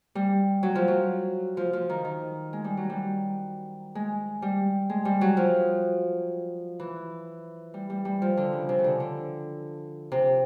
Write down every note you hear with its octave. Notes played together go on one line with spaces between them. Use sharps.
G3
F#3
F3
F#3
F3
F3
D#3
D#3
G#3
G3
F#3
G3
G#3
G3
G#3
G3
F#3
F3
E3
G3
G3
G3
F3
D3
C#3
C3
C#3
D3
D3
C3